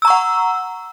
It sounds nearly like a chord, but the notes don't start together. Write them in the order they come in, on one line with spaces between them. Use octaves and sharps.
E6 A#5 C#6 F#5